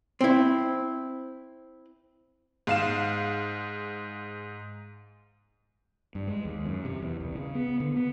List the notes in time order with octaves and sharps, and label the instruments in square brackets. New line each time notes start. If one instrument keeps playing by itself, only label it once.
[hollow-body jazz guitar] C4 E4
[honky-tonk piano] G#2 F5 E7
[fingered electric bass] G2
G#3
D#2
F#2
C3
E2
C2
C#3
B3
D3
B3